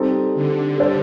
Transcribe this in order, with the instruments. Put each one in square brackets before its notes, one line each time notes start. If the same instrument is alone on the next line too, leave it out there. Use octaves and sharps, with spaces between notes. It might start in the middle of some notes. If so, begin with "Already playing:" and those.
Already playing: [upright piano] G3 C4 D#4 A4
[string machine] D3
[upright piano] G3 D4 A4 C5